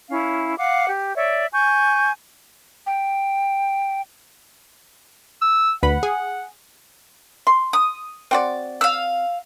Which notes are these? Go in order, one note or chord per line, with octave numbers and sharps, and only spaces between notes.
C#4 E4 F5
F5 F#5 D6
G4
C#5 D5 E5
G#5 C#6 G6
G5
E6
D2 B4 F#5 B5
G#4
C6
D#6
C4 F#4 D5
F5 E6